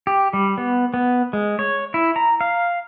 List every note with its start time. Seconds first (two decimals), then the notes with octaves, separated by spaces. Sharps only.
0.07 G4
0.33 G3
0.58 B3
0.94 B3
1.33 G#3
1.59 C#5
1.94 E4
2.16 A#5
2.41 F5